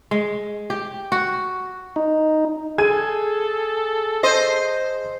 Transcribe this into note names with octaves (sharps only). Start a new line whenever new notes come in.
G#3
G4
F#4
D#4
G#4 A4 G#6 D#7
C5 D#5